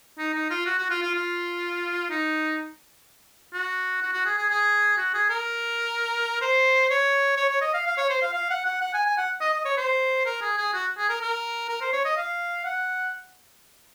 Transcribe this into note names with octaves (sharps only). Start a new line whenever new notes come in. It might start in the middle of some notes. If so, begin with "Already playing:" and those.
D#4
D#4
F4
F#4
F#4
F4
F4
F4
D#4
F#4
F#4
F#4
G#4
G#4
G#4
F#4
G#4
A#4
C5
C#5
C#5
C#5
D#5
F5
F5
C#5
C5
F5
F5
F#5
F#5
F#5
G#5
G#5
F#5
D#5
D#5
C#5
C5
A#4
G#4
G#4
F#4
G#4
A#4
A#4
A#4
C5
C#5
D#5
F5
F#5